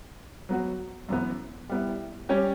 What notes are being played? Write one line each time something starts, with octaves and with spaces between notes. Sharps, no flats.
F#3 B3 F#4
F#2 E3 B3
G3 B3 E4
G3 C#4 G4 C#5